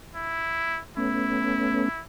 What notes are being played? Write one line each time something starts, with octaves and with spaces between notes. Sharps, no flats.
E4
A3 B3 C#4 E4